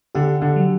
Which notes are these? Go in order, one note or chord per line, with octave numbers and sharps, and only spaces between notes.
D3 G4
D3
F#3